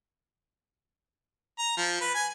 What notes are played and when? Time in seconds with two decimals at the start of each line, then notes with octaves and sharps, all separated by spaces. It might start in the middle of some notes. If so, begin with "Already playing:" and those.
1.59 A#5
1.77 F3
2.01 B4
2.15 G#5